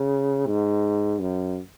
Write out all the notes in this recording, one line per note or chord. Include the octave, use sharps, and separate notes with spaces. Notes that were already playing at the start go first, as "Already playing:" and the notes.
Already playing: C#3
G#2
F#2